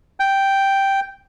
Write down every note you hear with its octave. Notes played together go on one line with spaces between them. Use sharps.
G5